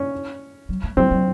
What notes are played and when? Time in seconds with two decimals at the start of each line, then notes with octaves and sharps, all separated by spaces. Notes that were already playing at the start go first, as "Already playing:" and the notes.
Already playing: C#4
0.69 F#3
0.83 A3
0.97 F#3 C4
1.11 F#3